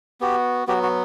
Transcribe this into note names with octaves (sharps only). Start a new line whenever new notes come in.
B3 F#4 G4
F#3 B3 F#4 G4
F#4